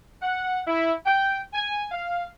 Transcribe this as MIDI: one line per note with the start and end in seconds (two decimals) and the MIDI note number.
0.22 0.61 78
0.67 0.92 64
1.06 1.38 79
1.53 1.86 80
1.92 2.26 77